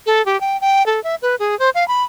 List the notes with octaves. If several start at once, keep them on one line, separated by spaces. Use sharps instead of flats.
A4
G4
G5
G5
A4
E5
B4
G#4
C5
F5
B5